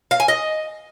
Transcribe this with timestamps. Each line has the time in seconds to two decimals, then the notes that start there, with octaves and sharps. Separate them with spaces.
0.11 F5
0.20 G#5
0.28 D#5